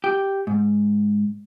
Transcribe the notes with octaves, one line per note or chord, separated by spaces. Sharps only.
G4
G#2